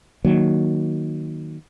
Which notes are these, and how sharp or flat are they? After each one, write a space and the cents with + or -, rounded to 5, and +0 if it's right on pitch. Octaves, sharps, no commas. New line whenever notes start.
D#3 +0 F#3 +0 A#3 +0